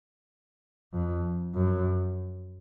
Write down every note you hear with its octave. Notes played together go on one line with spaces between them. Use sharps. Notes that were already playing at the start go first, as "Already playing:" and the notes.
F2
F#2